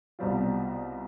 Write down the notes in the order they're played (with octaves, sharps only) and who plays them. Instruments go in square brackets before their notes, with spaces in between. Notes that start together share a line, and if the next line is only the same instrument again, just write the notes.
[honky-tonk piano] C2 B2 G3 C4 F4